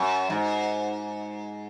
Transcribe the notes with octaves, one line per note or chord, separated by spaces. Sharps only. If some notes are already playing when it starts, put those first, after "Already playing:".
Already playing: F#2
G#2